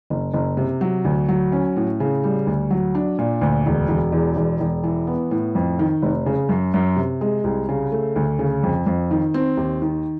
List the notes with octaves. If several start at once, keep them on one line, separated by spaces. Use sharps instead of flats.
F#1
F#1
C3
F#3
D2
F#3
C#4
A2
C#3
G3
D2
F#3
D4
A#2
D2
E1
E1
E2
E1
E1
E3
B3
A2
F2
D#3
F1
C#3
F#2
F#2
C3
G#3
C2
C#3
A3
D2
C#3
F2
F2
D#3
C4
D#2
D#3